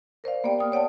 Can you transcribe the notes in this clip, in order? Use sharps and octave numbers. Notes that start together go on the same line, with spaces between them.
A#4 C5 D5 F5
A#3 B3 G4 D5 G5
G5 D#6 F6
C#5 D5 F#5 G5 A5